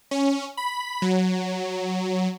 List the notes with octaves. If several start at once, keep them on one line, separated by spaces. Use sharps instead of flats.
C#4
B5
F#3